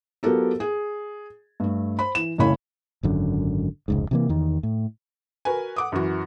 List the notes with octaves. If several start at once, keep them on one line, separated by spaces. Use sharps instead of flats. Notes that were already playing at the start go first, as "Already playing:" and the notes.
F#3 B3 F4 G4 A4 A#4
G#4
G2 A3
C5 B5
E3 E7
F#1 C2 C#3 A3 C#5 B5
G#1 F#2 D3
F1 C#2 G#2
C3 E3 A#3
E2 D#3
A2
F#4 A#4 B4 G#5
F#5 D6 D#6
F#2 E3 F#4